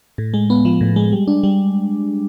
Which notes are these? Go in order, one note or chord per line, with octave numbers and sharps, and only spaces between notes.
A2
G#3
B3
F3
A2
G#3
G3
D4
G3